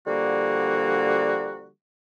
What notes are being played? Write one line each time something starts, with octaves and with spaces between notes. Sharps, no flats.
D3 F3 G3 A#3 F#4